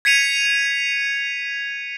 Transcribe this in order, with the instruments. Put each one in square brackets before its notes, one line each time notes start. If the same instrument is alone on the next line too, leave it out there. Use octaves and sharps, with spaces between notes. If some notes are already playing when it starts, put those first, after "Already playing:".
[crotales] G#6 B6 C#7 D#7 F7